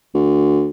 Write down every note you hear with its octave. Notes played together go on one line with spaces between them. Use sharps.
D2